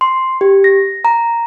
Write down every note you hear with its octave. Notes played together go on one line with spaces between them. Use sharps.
C6
G4
A#6
A#5